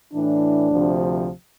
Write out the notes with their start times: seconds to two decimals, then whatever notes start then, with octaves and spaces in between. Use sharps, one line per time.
0.12 A2 E3 D4
0.71 D2 C3 F3